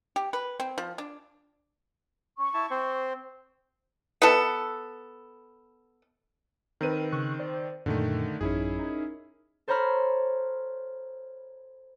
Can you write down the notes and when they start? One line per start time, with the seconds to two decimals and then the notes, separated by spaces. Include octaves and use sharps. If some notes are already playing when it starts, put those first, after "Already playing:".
0.16 G4
0.33 B4
0.60 C4
0.78 F3
0.98 D4
2.38 C#4 C#6
2.54 E4 A5
2.71 C4 C5
4.22 B3 A4
6.81 D#3 C4 A#4 B4 D#7
7.12 C#3 C#6 F#6
7.39 C5 D5
7.86 F#2 A#2 D3 D#3 A3
8.41 A1 F#2 C#4 D#4 E4 G#4
8.79 D#4 A#4
9.68 A4 C5 C#5 A#5 B5 F6